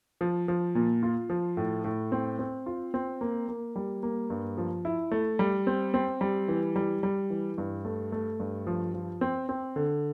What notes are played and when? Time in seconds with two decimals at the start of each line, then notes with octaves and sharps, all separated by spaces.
0.21 F3
0.48 F3
0.75 A#2
1.03 F4
1.30 F3
1.57 A2
1.84 A2
2.12 C4
2.39 C4
2.66 F4
2.94 C4
3.21 A#3
3.48 A#3
3.76 G3
4.03 A#3
4.30 G2
4.58 F3
4.85 E4
5.11 A3
5.39 G3
5.67 C4
5.94 C4
6.21 G3
6.48 E3
6.76 G3
7.03 G3
7.30 E3
7.58 G2
7.85 A3
8.12 A3
8.40 G2
8.67 F3
8.94 F3
9.21 C4
9.49 C4
9.76 D3